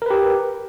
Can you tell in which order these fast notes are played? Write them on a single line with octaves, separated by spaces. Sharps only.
A#4 B4 G4